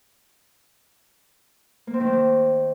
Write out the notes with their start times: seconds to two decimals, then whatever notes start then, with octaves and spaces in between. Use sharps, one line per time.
1.87 A#3
1.94 C4
2.00 D#3
2.06 A#3
2.13 D#3